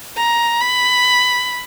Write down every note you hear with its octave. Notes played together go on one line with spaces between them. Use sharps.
A#5
B5